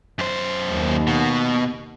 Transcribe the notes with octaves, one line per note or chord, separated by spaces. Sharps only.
F#2 C5
D#2
B2